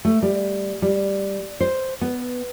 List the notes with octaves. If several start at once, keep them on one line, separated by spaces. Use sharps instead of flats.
A3
G3
G3
C5
B3